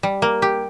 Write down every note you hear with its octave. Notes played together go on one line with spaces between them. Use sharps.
G3
A#3
G4